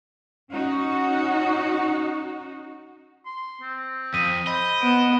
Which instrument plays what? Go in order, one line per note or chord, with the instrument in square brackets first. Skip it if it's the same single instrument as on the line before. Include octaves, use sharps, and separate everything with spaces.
[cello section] C#4 D#4 F#4
[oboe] C6
C4
[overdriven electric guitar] F2 [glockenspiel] D#6 B6 D#7
[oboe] C5 [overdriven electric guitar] D#5 [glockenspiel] B5
[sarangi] B3 [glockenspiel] D7 E7